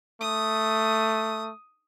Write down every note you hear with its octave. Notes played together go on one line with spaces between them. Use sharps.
A3 D#6